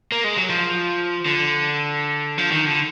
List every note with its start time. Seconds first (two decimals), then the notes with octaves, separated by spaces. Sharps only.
0.12 A#3
0.24 G#3
0.37 F#3
0.50 F3
1.26 D3
2.38 F3
2.52 D#3
2.66 D3